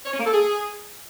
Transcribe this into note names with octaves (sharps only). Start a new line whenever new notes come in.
C#5
C#4
A#3
A4
G#4